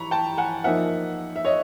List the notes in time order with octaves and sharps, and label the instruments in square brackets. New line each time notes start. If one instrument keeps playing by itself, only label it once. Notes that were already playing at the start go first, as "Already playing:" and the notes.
Already playing: [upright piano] E3 A#5 B5 C#6
G5 A5
F#5 G#5
F3 A#3 D#4 E5 F#5
E5
C#5 D#5